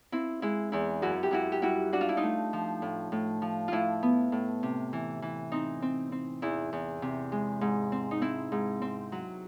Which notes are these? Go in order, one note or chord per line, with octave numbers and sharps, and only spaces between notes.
C4 E4
G#3 E4
E2 E4
F#2 E4 F#4
G4
F#2 E4 F#4
G4
G3 E4 F#4
D4 F#4
F4
E4
D#4 F4
A3
F3
A2
A2
F3
A2 E4 F4
B3
A2
C3
E3
E3
C4 D#4
C4
C4
E2 E4
E2
C3
G#3
G#2
C4
D#4
C4 E4
G#2
C4
F#3